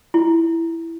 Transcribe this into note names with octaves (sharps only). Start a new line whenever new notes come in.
E4